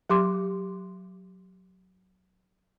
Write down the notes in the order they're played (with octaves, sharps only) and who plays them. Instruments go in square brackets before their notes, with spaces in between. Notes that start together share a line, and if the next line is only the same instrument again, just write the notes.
[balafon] F#3 G4 C6 D6